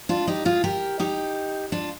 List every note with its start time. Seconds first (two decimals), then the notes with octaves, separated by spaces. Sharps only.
0.09 D4 F4
0.27 D#4 G4
0.45 F4 G#4
0.64 G4 A#4
1.00 D#4 G4
1.72 D4 F4